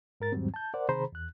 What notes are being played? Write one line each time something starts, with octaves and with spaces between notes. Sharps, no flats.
G#2 A#4 A6
E2 G#2 D#3 F#3 G3 C4
A5 G6
A#4 C5 D5 F#5
C3 D#3 G#4 C5 A#5 B5
E2 F#6